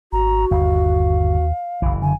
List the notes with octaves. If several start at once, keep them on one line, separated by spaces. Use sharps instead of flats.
G#1 F#4 A#5
G1 D#2 F5
F#1 B1 E3
D3 G#5